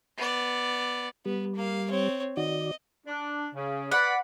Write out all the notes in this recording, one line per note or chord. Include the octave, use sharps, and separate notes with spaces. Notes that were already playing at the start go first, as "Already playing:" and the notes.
B3 D5
G3 B3
A#3 F5
C4 C#5
D#3 F#4 D5 D#5
D4
C#3
B4 D5 F#5 B5